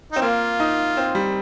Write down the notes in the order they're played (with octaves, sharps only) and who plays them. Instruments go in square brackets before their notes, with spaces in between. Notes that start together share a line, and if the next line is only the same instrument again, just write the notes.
[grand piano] C4 [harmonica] D#4
[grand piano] A#3 [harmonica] F4
[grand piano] D#4
C4
G3